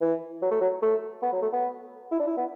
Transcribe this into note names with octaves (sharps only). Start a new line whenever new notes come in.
E3
F#3
A3
F#3
A3
B3
F#3
A3
B3
E4
D4
E4
B3